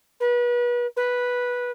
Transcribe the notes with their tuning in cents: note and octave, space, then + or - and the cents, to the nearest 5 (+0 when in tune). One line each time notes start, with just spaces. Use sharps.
B4 -35
B4 -10